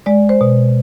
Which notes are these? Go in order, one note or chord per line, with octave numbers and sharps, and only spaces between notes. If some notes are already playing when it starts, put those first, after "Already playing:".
G#3 D5
C5
B2